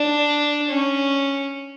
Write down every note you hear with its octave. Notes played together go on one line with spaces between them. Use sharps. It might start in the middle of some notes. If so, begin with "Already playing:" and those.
Already playing: D4
C#4